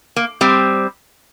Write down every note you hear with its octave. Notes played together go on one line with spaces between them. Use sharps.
A#3
G3 C4